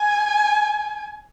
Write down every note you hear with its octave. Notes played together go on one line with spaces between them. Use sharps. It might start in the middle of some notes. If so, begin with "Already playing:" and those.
Already playing: G#5